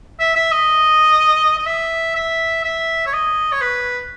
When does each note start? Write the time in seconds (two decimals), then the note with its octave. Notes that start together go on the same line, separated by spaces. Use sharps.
0.19 E5
0.35 E5
0.52 D#5
1.58 D#5
1.66 E5
2.15 E5
2.64 E5
3.06 C#5
3.13 D#5
3.52 C#5
3.61 B4